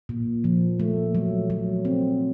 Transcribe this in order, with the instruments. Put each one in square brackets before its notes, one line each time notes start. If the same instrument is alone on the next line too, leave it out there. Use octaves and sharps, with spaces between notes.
[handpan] A#2
F3
A3
F#3
F#3
C4